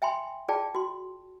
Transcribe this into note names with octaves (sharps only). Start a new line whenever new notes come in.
E5 G5 G#5 B5 C6
F4 G#4 D5 G5 A5
F#4 C6